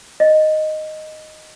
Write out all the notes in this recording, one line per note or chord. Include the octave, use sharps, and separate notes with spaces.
D#5